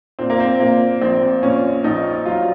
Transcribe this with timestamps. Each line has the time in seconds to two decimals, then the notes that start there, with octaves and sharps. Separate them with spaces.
0.19 A#2 C4
0.30 A#3
0.40 C4
0.60 A#2 A#3
1.01 A#1 C4
1.43 A#2 C#4
1.84 A#1 D#4
2.25 F#3 F4